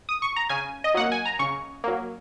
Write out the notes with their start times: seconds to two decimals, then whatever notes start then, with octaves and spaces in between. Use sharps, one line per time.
0.09 D#6
0.22 C#6
0.36 A#5
0.49 C#3 G#5
0.84 D#5
0.94 F#3 A#3 F#5
1.12 G#5
1.25 A#5
1.39 C#3 C#6
1.84 F#3 A#3